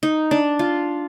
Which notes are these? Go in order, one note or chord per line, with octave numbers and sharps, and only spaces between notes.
D#4
D4
F4